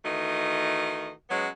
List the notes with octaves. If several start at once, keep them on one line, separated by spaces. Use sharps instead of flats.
D#3 E3 A3 F#4 D#5
F#3 G#3 B3 C#4